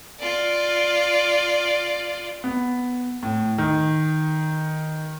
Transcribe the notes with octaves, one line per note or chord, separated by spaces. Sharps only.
F4 D5
B3
A2
D#3